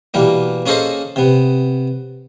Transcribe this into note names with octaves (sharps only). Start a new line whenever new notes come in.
B2 E3 G3 A#3
A#3 C#4 G#4 A4 C5 D#5
C3 B3